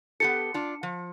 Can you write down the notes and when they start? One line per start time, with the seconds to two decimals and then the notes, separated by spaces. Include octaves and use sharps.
0.20 B3 G4 A4 C#7
0.54 D4 F4
0.83 F3